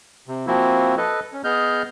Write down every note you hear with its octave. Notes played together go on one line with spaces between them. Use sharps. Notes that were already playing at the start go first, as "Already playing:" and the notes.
C3
F3 A#3 C4 E4 F#4
A4 B4 D#5
C#4
B3 G#4 D#5 F6 G6